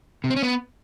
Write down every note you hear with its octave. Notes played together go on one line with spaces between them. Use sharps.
C3
C4
C#4
B3